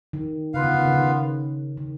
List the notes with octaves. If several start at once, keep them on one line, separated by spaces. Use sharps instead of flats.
D#3
C#3 B3 F4 B4 F5
D#3
D#3
C#3
D#3
D#3